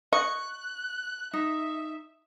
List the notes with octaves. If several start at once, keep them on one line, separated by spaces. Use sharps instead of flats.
D#5 C#6 F#6
D#4 E5